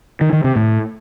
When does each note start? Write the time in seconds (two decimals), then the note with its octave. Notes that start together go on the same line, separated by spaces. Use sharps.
0.21 D#3
0.33 D#3
0.44 C3
0.56 A2